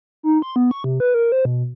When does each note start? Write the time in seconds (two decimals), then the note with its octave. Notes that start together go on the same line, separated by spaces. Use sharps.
0.23 D#4
0.42 C6
0.56 B3
0.71 C#6
0.84 C3
1.00 B4
1.14 A#4
1.32 C5
1.45 B2